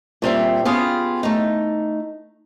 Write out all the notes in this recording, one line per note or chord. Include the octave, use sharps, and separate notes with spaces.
A#2 G3 C4 E5
B3 C#4 F4 G4 G#4
A3 D#4